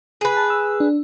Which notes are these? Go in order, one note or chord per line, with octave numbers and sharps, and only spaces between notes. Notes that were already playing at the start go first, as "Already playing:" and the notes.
G#4 B4
A5
E6
D4